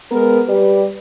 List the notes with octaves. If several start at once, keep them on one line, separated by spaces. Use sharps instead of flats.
G#3 B3 A#4
G3 G4 B4 D5